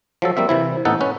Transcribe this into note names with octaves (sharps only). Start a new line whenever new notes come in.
F3 F#3 A4
G3 A#3 C4 E5
C3 E3 E4
A1 B3 D#4 A4 F#5
C#4 B4